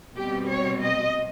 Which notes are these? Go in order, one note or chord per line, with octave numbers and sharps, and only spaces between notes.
B2 G3 C4 G4
C#5
D#5